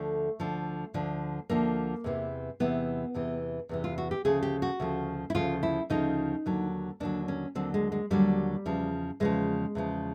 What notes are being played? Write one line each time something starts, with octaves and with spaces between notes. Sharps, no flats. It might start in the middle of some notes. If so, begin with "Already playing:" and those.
Already playing: D2 D3 F3 A3
D2 D3 F3
D2 D3 F3
D2 D3 F3 A#3
E2 C3 E3
E2 C3 E3 B3
E2 C3 E3
E2 C3 E3
F4
F#4
G4
D2 C#3 F3 G#4
G4
F#4
D2 C#3 F3
E4
D2 C#3 F3 F4
E4
D2 C#3 F3 D#4
D#2 D3 F#3
D#2 D3 F#3 D4
C#4
D#2 D3 F#3 C4
G#3
G#3
D#2 D3 F#3 G3
E2 C#3 F3
E2 C#3 F3 G#3
E2 C#3 F3